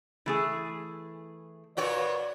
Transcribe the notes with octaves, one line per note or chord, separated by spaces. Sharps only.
E3 A3 G#4
A#2 F#4 B4 C#5 D5